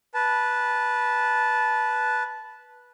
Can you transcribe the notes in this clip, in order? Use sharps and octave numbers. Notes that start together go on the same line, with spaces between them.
B4 A5